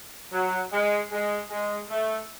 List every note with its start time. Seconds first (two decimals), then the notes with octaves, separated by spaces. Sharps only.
0.33 F#3
0.73 G#3
1.12 G#3
1.50 G#3
1.89 A3